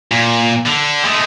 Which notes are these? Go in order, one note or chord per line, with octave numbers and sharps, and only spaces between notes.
A#2
D3
G#3 A3